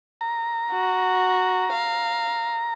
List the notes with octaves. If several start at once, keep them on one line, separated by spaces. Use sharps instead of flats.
A#5
F#4
F5